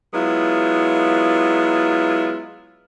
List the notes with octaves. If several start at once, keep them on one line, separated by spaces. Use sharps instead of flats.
F#3 G#3 B3 E4 F4